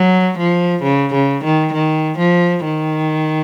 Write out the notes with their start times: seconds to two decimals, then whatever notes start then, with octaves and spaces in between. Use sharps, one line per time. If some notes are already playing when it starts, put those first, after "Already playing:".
Already playing: F#3
0.38 F3
0.83 C#3
1.14 C#3
1.44 D#3
1.73 D#3
2.18 F3
2.64 D#3